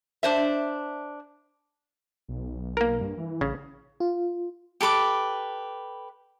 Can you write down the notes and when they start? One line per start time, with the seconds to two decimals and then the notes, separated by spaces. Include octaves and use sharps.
0.23 D4 C5 E5
2.29 B1
2.77 A#3 A#4
3.01 G2
3.18 E3
3.41 A1 C#3
4.00 F4
4.81 G4 A4 B4 D6